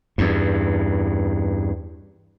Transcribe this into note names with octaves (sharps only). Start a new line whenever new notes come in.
E2 G2